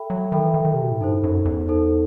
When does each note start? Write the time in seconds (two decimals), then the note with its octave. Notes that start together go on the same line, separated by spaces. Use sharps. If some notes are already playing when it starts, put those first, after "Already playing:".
Already playing: A4 E5 G5 B5
0.10 F#3
0.32 D#3 A4 E5 G5 B5
0.44 E3
0.54 D#3
0.65 D#3
0.74 C3
0.82 B2
0.91 A2
1.01 G2 D#4 A4 C5
1.24 F#2
1.45 E2
1.68 D#4 A4 C5